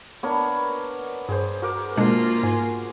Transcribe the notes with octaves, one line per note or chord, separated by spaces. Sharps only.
B3 D4 A#4 C#5
G2 G#4 C5
F#4 A#4 D6
B2 G#3 A#3 D4 F4 G#4
G#2 G#5